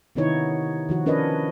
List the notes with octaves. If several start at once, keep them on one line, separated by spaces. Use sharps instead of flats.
C3 D#3 B3 D#4 E4 C#5
D#3 F3 F#4
C#4 D4 A#4 B4 C#5 D#5